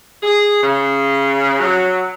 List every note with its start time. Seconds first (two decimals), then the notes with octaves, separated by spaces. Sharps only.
0.23 G#4
0.62 C#3
1.59 F#3